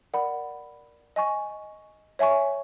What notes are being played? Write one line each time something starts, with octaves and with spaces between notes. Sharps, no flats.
A#4 D5 F#5 B5
D#5 G#5 C#6
C#5 E5 G#5 C#6